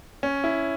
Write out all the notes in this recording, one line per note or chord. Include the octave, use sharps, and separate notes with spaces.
C#4
E4